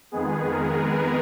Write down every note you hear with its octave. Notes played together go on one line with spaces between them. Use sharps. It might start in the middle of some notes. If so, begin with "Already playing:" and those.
F2 D#3 G#3 B3 G#4
A#4
B4